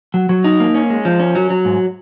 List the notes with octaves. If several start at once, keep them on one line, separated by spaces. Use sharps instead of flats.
F#3
F#3
D#4
A#3
C#4
G#3
F3
C#4
F#3
F#3
G#2